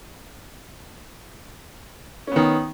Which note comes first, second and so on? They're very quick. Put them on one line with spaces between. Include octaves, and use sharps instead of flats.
C#4 B3 D#3